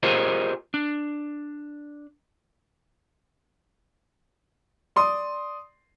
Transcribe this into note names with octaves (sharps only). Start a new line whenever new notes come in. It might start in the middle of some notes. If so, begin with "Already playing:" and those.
F4 G4 G#4 A#4 C5 D#5
D4
D5 C6 D#6